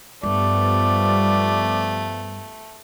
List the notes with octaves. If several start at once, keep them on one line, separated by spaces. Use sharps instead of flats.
G2 F3 G3 A3 B3 D5